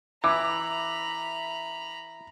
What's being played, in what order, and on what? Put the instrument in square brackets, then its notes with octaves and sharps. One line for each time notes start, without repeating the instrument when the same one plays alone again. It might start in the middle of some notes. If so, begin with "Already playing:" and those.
[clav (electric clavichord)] E3 [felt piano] E5 D6 [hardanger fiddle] A#5 B5